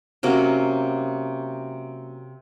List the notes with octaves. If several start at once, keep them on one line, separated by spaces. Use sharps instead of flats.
C3 F#3 A#3 C#4